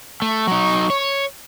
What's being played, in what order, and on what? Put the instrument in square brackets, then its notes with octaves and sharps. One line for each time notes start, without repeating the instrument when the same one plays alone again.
[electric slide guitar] A3 [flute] C#6
[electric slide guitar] F#3 D#4
C#5